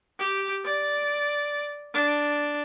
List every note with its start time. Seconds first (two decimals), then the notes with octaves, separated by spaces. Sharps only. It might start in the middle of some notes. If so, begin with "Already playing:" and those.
0.20 G4
0.65 D5
1.94 D4